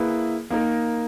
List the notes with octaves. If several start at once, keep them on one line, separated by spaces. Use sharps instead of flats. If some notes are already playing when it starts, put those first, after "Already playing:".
Already playing: A#3 E4 G#4 B4
A#3 D#4 A#4